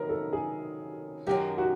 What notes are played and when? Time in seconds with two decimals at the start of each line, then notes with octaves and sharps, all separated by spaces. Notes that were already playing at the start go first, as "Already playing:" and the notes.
Already playing: C3 D#3 F#3 B3 A#4
0.09 A4
0.33 G#4
1.27 F#2 D#3 F#3 G4
1.58 F#4